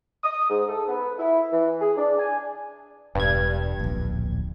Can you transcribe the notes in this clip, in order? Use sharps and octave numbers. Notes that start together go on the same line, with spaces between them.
D#6
G#2
A4
B3
E4
E3
G#4
D4
G#5
E1 G2 G#6
D1 A#1